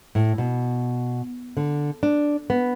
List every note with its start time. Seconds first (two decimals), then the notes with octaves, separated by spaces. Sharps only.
0.15 A2
0.38 B2
1.57 D3
2.03 D4
2.50 B3